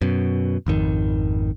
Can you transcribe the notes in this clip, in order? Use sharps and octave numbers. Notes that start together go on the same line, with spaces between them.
F#2 B2
G#1 F2 D#3